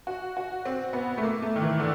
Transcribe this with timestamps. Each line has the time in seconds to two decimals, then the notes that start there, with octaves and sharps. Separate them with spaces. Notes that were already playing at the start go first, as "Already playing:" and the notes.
0.07 F#4
0.37 F#4
0.65 C4
0.93 B3
1.18 A3
1.23 A#3
1.42 A3
1.56 D#3
1.62 E3
1.80 D3